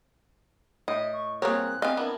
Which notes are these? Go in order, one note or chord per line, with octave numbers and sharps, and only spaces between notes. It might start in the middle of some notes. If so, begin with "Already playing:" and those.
A2 D#5 E5
C#6
C2 A#3 C4 G#4 A#4 C#5 F#6
C4 D#5 F5 G#5
B3 D4 E4 A#4